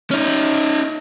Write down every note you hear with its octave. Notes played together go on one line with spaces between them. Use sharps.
C#4 D#4